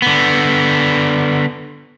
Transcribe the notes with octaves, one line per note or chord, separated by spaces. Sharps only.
D3 B3